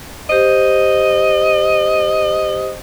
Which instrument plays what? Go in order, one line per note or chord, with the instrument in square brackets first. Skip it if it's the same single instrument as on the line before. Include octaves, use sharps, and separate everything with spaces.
[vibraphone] G4 C5 [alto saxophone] D#5